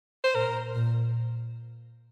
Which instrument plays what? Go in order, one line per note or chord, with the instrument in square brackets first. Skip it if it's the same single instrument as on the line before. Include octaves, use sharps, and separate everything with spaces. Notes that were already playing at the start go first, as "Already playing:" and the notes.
[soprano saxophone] C5
[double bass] A#2 [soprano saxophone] A#4
[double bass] A#2